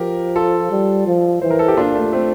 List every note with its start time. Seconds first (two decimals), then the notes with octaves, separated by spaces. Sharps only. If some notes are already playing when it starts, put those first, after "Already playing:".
Already playing: F3 G4 A#4
0.35 F4 A4
0.71 G3
1.07 F3
1.42 E3 C5
1.50 A#4
1.59 A4
1.68 G4
1.77 A#2 D4 F4
1.95 A3
2.13 A3 C4